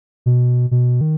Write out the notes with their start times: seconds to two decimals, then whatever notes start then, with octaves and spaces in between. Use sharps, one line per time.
0.26 B2
0.71 B2
1.01 D#3